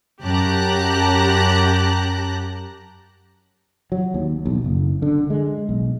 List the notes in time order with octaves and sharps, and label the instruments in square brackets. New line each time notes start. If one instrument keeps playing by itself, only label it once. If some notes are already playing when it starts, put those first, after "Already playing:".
[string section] F#2 G4 A5 A#5 F#6
[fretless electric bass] F#3
D#2
B1
F#1
D3
G#3
B1